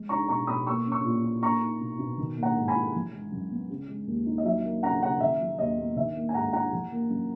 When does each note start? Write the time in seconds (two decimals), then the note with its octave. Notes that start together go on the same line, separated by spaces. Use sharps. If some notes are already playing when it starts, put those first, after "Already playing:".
Already playing: G#3
0.09 D#4 A#5 C#6
0.28 B2 A#5 C#6
0.47 B2 B5 D#6
0.67 A#3 C#6 E6
0.86 C#4
0.92 C#6 E6
1.04 A#2
1.23 E4
1.42 A#3 A#5 C#6
1.61 D#4
1.80 B2
1.99 B2
2.18 D#3
2.37 A#3
2.43 F#5 A#5
2.56 G#2
2.68 G#5 B5
2.75 E4
2.94 E3
3.12 G#3
3.32 F#2
3.51 B3
3.70 C#3
3.88 G#3
4.07 D#2
4.26 D#4
4.38 D#5
4.45 F#3 E5
4.64 A#3
4.83 C#3 F#5 A#5
5.02 C#3 F#5 A#5
5.20 D#3 E5
5.40 F#3
5.58 D#2 D#5
5.77 B3
5.96 D#3 E5
6.16 A#3
6.29 G#5
6.34 G#2 F#5 A#5
6.53 E4 F#5 A#5
6.72 E3
6.92 A#3
7.10 F#2